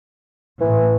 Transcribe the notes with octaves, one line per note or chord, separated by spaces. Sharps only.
A2 E3